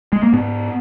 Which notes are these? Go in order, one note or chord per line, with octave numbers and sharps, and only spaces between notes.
G#3
A#3
G#2 B3